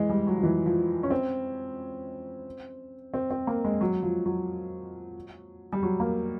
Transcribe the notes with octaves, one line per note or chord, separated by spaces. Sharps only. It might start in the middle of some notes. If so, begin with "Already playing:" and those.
Already playing: E3 G#3
G3
F#3
F3
E3
F3
C#4
C4
C4
C4
A#3
G#3
F#3
F3
F#3
G3
F#3
A#3